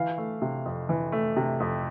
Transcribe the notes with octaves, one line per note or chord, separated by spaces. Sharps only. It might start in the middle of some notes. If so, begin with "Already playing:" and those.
Already playing: E3 F5
A3
C3
F2
E3
A3
C3
F2